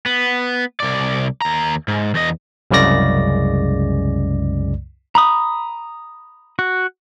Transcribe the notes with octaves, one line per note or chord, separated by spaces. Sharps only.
B3
C2 D5
D#2 A#5
G#2
E2 D#5
C2 F#2 C#3 G#3 D5 A#6
A#5 B5 D#6
F#4